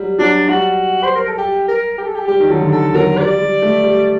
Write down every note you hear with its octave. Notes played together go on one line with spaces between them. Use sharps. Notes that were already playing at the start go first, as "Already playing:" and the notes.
Already playing: F#3 G3
F#3 D4
G3 F#4
C5
A#4
A4
G4
A#4
G4
A4
G4
G3 G4
D#3
F#3 A4
D3
D#3 A4
F#3 A#4
G3 D5
G3
A3
G3